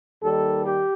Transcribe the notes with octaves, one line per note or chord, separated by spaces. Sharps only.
D#2 D#3 G3 A4
G4